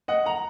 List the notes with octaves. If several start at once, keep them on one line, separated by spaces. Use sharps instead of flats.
D#5 F#5
F#5 A#5